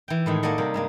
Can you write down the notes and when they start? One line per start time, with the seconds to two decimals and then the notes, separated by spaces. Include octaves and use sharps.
0.08 E3 G5
0.26 A2 D#3 G#3
0.43 A#3 F#4 A4 D5 D#5 F#5
0.58 C3 G3 A#3
0.74 G2 G#3 A#3